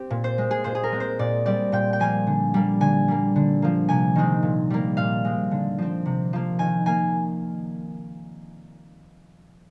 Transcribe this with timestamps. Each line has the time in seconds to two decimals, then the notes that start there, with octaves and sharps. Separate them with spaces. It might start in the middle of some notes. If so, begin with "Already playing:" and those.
Already playing: C4 G4
0.10 A#2
0.24 C5
0.38 G#3 C4
0.51 G#4
0.64 A#2 C5
0.75 G#4
0.83 A#4
0.92 G#3 C4
1.00 C5
1.19 A#2 D5
1.45 G3 C4 D5
1.72 A#2 G5
1.93 G5
2.00 F3 A#3 G#5
2.27 D3
2.54 G3 A#3
2.81 D3 G#5
3.08 G3 A#3
3.36 D3
3.62 F3 A#3
3.89 C3 G#5
4.16 D#3 G#3 C4
4.43 A#2
4.70 G3 A#3
4.97 A#2 F5
5.25 G#3 C4
5.51 D3
5.78 F3 C4
6.06 C3
6.33 F3 A#3
6.59 D#3 G#5
6.86 A#3 G#5